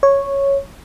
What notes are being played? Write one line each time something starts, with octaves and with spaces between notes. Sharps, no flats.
C#5